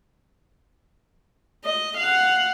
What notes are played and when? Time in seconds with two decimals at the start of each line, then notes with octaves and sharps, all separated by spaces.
1.65 D#5
1.97 F5 F#5